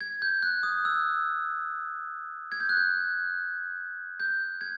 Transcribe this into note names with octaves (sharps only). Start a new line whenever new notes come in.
G#6
G6
F#6
D#6
E6
G#6
G6
F#6
G6
G6
G#6